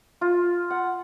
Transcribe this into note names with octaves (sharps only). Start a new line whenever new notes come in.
F4
F#5